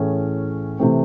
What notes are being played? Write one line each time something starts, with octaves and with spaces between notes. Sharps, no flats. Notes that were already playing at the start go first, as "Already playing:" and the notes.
Already playing: A2 E3 A3 C#4 G#4
C3 E3 A3 C4